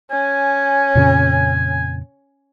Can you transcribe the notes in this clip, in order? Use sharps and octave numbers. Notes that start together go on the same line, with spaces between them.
C#4 G#5
F2 A#2 C#3